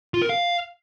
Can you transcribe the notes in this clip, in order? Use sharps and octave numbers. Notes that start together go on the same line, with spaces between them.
F4
A#4
F5